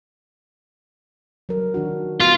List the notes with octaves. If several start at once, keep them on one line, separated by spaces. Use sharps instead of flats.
F#3 A#4
D#3 D4 F#4
B3 F4 F#4